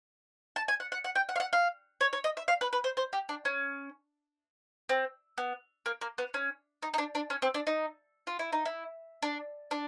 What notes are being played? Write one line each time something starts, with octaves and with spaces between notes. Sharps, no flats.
A5
G#5
F#5
F#5
F#5
G5
F#5
F5
F#5
F5
C#5
C#5
D#5
E5
F5
B4
B4
C5
C5
G4
D4
C#4
C4
B3
A#3
A#3
B3
C#4
D#4
D#4
D4
D4
C#4
C4
D4
D#4
F4
E4
D#4
E4
D4
D4